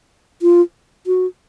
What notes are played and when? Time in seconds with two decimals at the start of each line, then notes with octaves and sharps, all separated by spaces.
0.42 F4
1.07 F#4